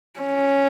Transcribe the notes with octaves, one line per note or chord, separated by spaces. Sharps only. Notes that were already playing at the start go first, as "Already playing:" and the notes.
C#4